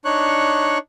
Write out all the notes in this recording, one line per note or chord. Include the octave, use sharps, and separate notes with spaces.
D4 D#4 C#5 C#6 F#6